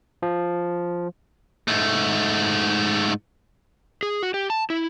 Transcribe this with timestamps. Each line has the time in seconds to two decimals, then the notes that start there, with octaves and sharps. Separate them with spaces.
0.22 F3
1.68 G#2 A3
4.03 G#4
4.23 F#4
4.34 G4
4.50 A5
4.70 E4